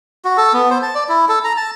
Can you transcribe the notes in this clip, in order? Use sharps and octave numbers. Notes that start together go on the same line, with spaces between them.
F#4
A4
B3
C5
A5
D5
E4
A4
A#5
A5